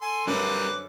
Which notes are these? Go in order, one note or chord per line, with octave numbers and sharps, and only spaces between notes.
A4 G#5 C6
F#2 D3 G3 C4 C#4 A#4 B4 D6